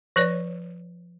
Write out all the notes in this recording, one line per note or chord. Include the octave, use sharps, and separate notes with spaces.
F3 B4 C#5 D5